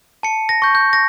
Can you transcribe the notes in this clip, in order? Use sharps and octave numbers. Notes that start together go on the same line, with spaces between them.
A5 C#7
A#6
C#6 G6
G6
A#6